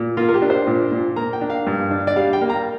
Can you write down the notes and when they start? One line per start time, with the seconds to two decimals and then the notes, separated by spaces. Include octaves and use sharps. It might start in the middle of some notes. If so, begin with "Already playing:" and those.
Already playing: A#2
0.17 A#3 F4
0.29 A#4
0.34 G4
0.42 D4
0.50 C5
0.67 A#2
0.92 A#2
1.16 A#3 A#5
1.33 G5
1.41 D4
1.50 F5
1.67 G2
1.91 D4
2.07 D5
2.16 G3 F5
2.33 G5
2.41 A#3
2.50 A#5